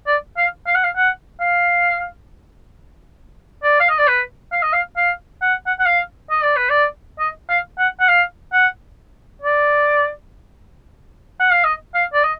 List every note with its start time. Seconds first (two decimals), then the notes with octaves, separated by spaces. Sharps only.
0.07 D5
0.37 F5
0.67 F5
0.75 F#5
0.84 F5
0.96 F#5
1.40 F5
3.63 D5
3.80 F5
3.89 D#5
3.99 D5
4.08 B4
4.52 F5
4.63 D#5
4.73 F5
4.97 F5
5.42 F#5
5.67 F#5
5.80 F#5
5.86 F5
6.30 D#5
6.43 D5
6.56 B4
6.70 D5
7.19 D#5
7.49 F5
7.79 F#5
8.00 F#5
8.08 F5
8.53 F#5
9.42 D5
11.40 F#5
11.52 F5
11.64 D#5
11.94 F5
12.13 D5
12.24 D#5